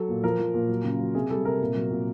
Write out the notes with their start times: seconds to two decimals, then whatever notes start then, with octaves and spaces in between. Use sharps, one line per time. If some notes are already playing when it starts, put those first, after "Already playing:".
Already playing: F#3 A4
0.09 A#2
0.23 F3 A#4
0.39 F3
0.54 A#2
0.69 F#3
0.84 C#3
1.00 F#3
1.15 C3 G#4
1.30 G3 A4
1.45 C3 A#4
1.61 A#2
1.76 F#3
1.91 A#2